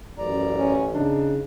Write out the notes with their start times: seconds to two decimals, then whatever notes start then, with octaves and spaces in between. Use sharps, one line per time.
0.18 A1 F#2 D5 A#5
0.57 C#4
0.94 C#3 D4 D#4